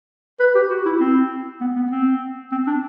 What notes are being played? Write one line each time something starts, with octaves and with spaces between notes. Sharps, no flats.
B4
G4
F#4
E4
C4
B3
B3
C4
C4
D4